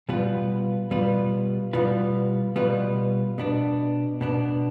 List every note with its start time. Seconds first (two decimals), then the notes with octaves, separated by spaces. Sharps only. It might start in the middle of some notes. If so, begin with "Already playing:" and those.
0.09 B2 G3 B3 F4 B4
0.91 B2 G3 B3 F4 B4
1.73 B2 G3 B3 F4 B4
2.56 B2 G3 B3 F4 B4
3.38 B2 B3 D4
4.21 B2 B3 D4